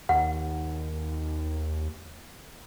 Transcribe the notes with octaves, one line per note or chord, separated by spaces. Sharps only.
D#2 F#5